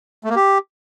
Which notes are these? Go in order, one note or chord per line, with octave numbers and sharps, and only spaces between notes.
A3
A#3
G4